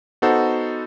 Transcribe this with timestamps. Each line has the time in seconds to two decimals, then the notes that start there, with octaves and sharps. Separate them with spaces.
0.22 B3 D#4 F#4 A4 C5 F#5